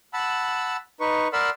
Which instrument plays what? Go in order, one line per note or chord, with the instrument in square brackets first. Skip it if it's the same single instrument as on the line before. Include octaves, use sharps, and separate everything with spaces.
[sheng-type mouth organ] F#5 A5 B5 E6
D#4 B4 C#6
A#4 D5 F#5 B5 C6 E6